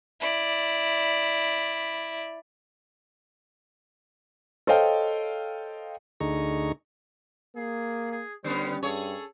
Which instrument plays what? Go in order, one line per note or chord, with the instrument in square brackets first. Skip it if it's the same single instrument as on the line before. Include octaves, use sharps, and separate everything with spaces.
[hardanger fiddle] E4 D5
[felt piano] A4 C5 C#5 D#5 F5 G5
[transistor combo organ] D2 D3 D#4 G#4 A#5 C#6
[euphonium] A#3 [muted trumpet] G#4
[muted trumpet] G#4
[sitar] D3 B3 C#4 [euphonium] G3 [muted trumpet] C5
[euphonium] G2 [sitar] G#4 C#5 [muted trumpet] A4